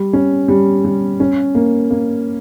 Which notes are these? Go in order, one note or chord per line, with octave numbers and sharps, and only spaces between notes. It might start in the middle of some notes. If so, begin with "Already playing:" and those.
Already playing: G3
C#4
G3
G3
C#4
A#3
A#3